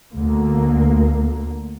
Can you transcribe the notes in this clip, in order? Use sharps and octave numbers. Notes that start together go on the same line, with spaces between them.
D2 D3 A#3